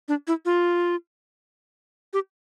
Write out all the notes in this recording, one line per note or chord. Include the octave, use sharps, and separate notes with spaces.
D4
E4
F4
G4